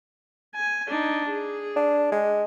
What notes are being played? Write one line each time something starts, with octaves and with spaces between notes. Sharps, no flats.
G#5
D4 D#4
G#4
D4
G#3